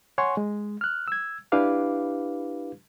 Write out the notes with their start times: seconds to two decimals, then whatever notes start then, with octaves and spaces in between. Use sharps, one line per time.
0.18 C#5 F#5 G#5 C6 C#6
0.37 G#3
0.81 F6 F#6
1.08 E6 G#6
1.52 D4 E4 G4 B4 F5 D6